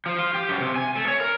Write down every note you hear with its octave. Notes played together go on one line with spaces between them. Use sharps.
F3
F4
G4
F#2
C3
G#5
A3
C#5
A#4